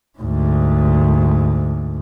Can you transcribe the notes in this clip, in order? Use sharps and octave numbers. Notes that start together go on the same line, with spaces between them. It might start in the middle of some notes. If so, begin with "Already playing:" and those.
D2 G#2